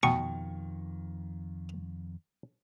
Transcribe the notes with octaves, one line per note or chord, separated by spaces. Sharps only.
F2 B2 D#3 G5 C#6